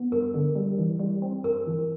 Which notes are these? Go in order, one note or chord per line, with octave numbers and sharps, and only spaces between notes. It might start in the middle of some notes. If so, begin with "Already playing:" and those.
Already playing: B3
G2 A#4
D3
G3
E3
G3
C4
G2 A#4
E3